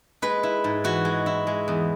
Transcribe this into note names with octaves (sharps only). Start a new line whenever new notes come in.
G#3 B4
E4
G#2
E3 F#4
G#3
E4
G#3
E2